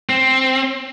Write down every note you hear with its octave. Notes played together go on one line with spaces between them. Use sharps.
C4